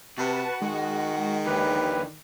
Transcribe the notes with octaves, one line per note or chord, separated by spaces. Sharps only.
C3 F#4 B4 A5
D#3 G#3
D#2 D3 E3 G4 B4